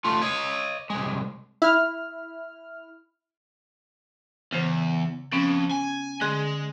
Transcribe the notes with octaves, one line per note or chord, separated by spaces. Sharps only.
A3 F4
C#5 D#5
C2 G#3
E4 F6
E2 C#3 C5
F2 B3 C#4
G#5
D3 G#3 G#4 C6